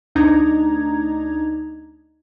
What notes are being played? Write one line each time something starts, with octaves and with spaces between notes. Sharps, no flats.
D2 D4 D#4 A#5 G#6